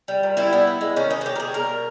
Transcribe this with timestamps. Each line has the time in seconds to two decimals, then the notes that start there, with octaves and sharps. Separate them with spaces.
0.08 G3
0.23 A#2
0.37 G3 E4
0.53 B3
0.67 B3
0.81 G#3
0.96 D#3 C#4
1.10 D#3 D#4
1.21 G#4
1.25 B2 G4
1.36 A#4
1.40 G3 G#4
1.54 B2 A#4
1.69 B2